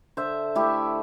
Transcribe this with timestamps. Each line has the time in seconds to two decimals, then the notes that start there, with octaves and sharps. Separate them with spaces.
0.17 D3 C5 E5
0.55 A3 E4 G4